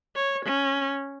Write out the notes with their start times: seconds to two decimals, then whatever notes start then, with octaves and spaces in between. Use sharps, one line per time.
0.16 C#5
0.45 C#4